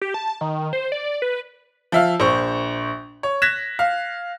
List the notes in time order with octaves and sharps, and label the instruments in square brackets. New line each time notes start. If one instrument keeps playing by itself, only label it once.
[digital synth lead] G4
A5
D#3
C5
D5
B4
[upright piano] F3 E5 F5
A#1 C5 C#6
C#5
F#6 G#6 A#6 B6 E7
F5